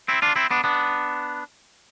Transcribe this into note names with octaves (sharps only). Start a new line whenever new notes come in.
C4 E4
D4 F4
C4 E4
B3 D4
B3 D4